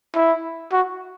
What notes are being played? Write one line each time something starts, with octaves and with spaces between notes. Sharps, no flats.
E4
F#4